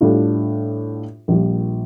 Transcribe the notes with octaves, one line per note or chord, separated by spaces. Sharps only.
A2 G3 D4 F4
A#1 A#2 G3 A#3 F4